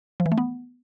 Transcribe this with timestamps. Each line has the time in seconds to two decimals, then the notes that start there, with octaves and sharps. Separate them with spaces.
0.20 F3
0.26 E3
0.32 A3
0.38 B3